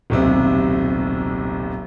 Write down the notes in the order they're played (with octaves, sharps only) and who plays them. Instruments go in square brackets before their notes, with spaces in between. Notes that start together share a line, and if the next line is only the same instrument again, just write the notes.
[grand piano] D#1 B1 C3